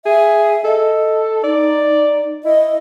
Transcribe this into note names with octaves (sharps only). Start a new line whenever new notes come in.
G#4 E5
A4 D#5
D#4 D5
E4 D#5